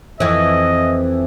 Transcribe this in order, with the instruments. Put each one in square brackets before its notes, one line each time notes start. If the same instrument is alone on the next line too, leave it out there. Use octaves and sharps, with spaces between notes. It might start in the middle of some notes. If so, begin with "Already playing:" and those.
[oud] F2 E3 [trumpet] D#5